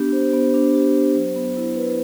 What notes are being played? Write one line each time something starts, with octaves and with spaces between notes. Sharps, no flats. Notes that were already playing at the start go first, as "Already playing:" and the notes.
Already playing: B3 D4 G4
C5
B3
D4
G4
C5
F#3
B3
E4
B4